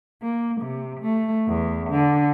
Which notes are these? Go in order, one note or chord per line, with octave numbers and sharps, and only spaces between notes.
A#3
C3
A3
E2
D3